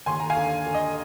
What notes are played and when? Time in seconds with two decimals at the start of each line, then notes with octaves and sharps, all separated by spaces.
0.06 D#2 G#5 C6
0.20 A#5
0.30 F5 G#5
0.37 D3
0.66 D3
0.74 D#5